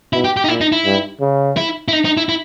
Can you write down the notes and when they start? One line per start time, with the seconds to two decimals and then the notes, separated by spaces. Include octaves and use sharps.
0.13 B2 E4
0.24 G4
0.37 G4
0.44 D#4
0.48 A#2 E4
0.61 D#4
0.72 E4
0.85 G2
1.21 C#3
1.57 E4
1.88 E4
1.93 D#4
2.05 D#4
2.17 E4
2.29 E4